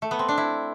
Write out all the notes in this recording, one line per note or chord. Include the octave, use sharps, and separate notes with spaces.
A3
B3
C4
D4
E4